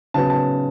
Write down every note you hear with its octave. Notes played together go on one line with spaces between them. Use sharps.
C#3 F#3 B3 A5
A5